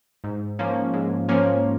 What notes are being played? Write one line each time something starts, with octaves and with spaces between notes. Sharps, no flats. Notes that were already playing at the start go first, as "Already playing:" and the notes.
G#2
F3 A#3 C#4
G#2
F3 A#3 C#4